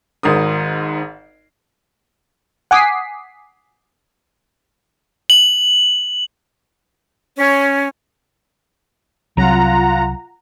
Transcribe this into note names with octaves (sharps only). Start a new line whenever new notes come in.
G#1 G#2 A#4 D#6
F#5 G#5 D6 D#6 B6 C7
F#7
C#4
C2 F#3 F4 F#5 A#5